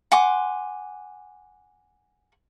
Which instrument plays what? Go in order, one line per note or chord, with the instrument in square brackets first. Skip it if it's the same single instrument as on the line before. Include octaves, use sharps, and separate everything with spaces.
[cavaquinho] F#5 G#5 C6 D6